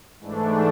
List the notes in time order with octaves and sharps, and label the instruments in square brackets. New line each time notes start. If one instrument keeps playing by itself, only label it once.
[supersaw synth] G#2 E3 A3 D4